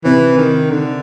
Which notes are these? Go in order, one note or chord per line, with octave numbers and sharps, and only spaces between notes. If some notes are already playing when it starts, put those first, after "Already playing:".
C3 E3 C4
D#3
D3